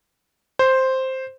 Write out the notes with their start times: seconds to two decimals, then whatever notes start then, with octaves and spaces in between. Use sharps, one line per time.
0.59 C5